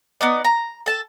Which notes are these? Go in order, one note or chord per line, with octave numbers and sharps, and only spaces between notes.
B3 D#4 D5
A#5
A4 A5